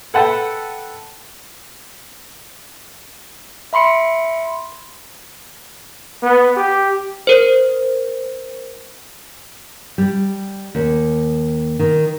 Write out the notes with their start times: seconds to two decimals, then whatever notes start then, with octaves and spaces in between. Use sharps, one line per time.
0.14 A4 B4 F#5 G5 A5
3.73 E5 B5 C6 C#7 D7
6.23 B3
6.57 G4
7.27 A#4 C5
9.98 G3
10.75 D#2
11.79 D#3